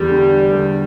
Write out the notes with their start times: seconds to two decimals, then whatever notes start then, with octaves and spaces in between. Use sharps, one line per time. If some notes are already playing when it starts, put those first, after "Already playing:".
Already playing: E2 G3
0.11 D3
0.52 D3